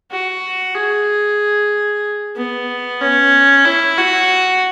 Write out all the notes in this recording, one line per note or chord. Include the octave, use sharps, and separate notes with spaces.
F#4
G#4
B3
C#4
E4
F#4